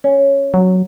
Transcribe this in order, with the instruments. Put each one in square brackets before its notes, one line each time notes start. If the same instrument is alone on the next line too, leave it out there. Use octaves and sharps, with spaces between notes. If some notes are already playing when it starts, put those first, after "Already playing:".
[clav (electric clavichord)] C#4
[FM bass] F#3